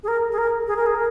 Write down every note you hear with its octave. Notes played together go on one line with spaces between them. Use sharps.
G#4
A#4
G#4
A#4
G#4
A#4
G#4
A#4